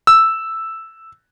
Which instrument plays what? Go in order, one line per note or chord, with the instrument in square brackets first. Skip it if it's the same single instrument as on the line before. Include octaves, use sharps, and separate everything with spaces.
[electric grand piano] E6